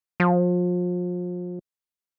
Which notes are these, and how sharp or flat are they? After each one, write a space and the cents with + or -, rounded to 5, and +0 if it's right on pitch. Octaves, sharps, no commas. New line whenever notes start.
F3 +35